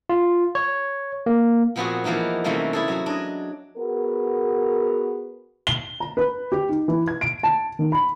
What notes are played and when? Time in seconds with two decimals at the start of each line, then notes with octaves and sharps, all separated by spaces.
0.09 F4
0.55 C#5
1.26 A#3
1.76 A#2 F3 B3 C4 F#4 G#4
2.04 E3 F3 A#3 B3 D#4
2.44 C3 E3 G3 A3 A#3 C#4
2.73 E4 G#4 A4
2.88 F#3 F#4 G#4
3.06 D4 D#5
3.77 B3 F#4 G#4 A#4
5.67 G7
6.00 A#5
6.17 B4
6.52 G4
6.69 D#4
6.88 E3
7.08 G#6
7.21 D7
7.43 A5
7.79 D#3
7.92 B5